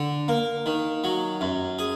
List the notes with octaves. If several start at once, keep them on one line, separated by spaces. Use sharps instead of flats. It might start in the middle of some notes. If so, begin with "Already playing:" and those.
Already playing: D3
A#3
D#3
F#3
F#2
G#4